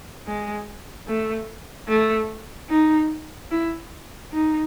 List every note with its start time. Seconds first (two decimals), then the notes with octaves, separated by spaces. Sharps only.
0.27 G#3
1.08 A3
1.89 A3
2.70 D#4
3.51 E4
4.32 D#4